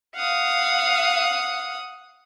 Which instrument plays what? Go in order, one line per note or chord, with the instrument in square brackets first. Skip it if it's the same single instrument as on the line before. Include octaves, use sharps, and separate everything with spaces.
[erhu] F5 [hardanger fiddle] F#5 D#6